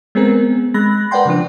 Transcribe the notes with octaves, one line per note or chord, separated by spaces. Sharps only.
G#3 B3 C4 G#4 A#4
G#3 B5 F#6 A#6
A#4 B4 D5 F#5 G5 C6
C#3 F3 D4